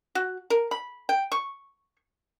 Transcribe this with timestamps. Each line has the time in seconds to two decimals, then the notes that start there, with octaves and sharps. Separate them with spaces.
0.15 F#4
0.50 A#4
0.71 B5
1.09 G5
1.32 C#6